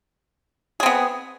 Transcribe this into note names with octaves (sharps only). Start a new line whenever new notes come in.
B3 C4 G#4